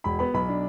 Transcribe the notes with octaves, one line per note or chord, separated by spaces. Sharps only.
E1 B5
B3 B5
B1 B5
D4